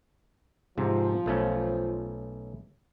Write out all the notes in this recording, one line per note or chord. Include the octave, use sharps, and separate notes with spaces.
G#2 C3 F3
B1 A3 C#4